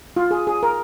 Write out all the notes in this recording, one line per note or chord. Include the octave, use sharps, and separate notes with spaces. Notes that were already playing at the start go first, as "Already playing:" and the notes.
F4
G#4
G#4
A#4